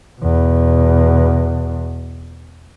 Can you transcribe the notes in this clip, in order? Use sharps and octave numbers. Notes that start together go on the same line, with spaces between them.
E2 B2